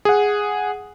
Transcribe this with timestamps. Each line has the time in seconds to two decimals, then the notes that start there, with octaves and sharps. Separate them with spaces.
0.05 G#4 F#5